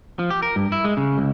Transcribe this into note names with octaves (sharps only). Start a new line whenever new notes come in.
F3
G4
A#4
G2
E4
G#3
C#3
C#2